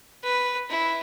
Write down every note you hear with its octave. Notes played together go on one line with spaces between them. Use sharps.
B4
E4